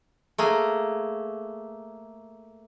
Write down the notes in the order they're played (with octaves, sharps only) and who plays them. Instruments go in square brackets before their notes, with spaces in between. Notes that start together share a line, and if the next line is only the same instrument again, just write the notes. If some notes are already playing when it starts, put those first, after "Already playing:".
[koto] A3 A#3 G#4